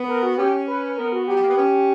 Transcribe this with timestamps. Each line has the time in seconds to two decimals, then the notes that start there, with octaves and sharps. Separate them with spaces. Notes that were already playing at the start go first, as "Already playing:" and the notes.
Already playing: B3
0.08 A#4
0.23 F#4
0.38 C#4 G4
0.67 B4
0.97 B3 A#4
1.12 F#4
1.27 F#3 G4
1.36 G3
1.43 A#3
1.50 B3
1.58 C#4